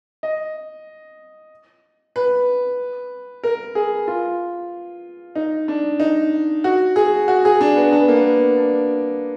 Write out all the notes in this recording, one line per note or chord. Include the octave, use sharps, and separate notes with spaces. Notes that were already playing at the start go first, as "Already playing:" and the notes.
D#5
B4
A#4
G#4
F4
D#4
D4
D#4
F#4
G#4
F#4
G#4
D4
B3
D4
B3
A#3
B3
D4